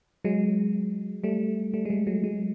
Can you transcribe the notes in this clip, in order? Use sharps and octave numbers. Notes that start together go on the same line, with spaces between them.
F#3 G#3
G3 A3
G3 A3
G#3
G3 A3
F#3 G#3
F#3 G#3